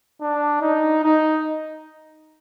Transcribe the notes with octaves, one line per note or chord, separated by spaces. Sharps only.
D4
D#4
D#4